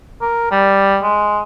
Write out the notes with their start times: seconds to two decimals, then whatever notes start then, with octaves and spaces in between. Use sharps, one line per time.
0.21 A#4
0.51 G3
1.03 G#3